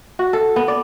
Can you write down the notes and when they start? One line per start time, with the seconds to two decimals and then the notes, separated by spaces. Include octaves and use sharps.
0.19 F#4
0.33 A4
0.56 B3
0.68 D5